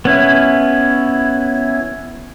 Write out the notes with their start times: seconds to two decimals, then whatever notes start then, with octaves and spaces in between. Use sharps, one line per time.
0.05 B3 C#4 E4